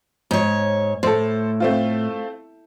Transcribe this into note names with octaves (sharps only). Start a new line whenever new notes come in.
G#2 C#5
A2 A4 C5
A3 C4 F4